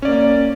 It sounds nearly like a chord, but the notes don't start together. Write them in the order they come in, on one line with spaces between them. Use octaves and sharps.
C#4 D5 A#3